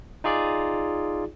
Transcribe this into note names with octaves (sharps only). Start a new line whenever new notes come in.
D#4 F4 G#4 D5